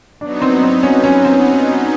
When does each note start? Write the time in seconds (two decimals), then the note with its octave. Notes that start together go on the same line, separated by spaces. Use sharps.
0.21 F#3 B3 D4 D#4
0.42 C4
0.63 C4
0.83 C#4
1.04 C#4
1.25 C4